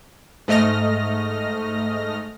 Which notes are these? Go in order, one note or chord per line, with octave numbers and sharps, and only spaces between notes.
G#2 A3 D#5 F6 A#6